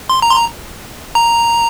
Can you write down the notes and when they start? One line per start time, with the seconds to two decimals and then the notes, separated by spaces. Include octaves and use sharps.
0.09 C6
0.22 A#5
0.31 C6
0.36 A#5
1.15 A#5